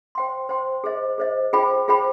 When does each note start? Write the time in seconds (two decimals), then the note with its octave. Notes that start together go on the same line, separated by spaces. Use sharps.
0.15 C5 G5 C6
0.49 C5 G5 C6
0.84 G#4 C5 D#5
1.18 G#4 C5 D#5
1.53 F4 G#4 C5 G5 B5
1.88 F4 G#4 C5 G5 B5